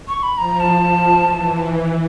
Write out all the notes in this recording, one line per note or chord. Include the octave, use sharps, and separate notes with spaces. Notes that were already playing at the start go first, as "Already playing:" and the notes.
C#6
B5
F3 A#5
A5
F3
E3